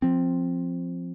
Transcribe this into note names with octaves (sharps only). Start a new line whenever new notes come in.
F3 C4